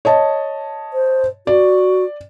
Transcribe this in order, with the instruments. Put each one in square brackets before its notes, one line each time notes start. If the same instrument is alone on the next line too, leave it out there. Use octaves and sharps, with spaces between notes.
[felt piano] C#5 D#5 A5
[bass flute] C5
[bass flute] F#4 [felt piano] D5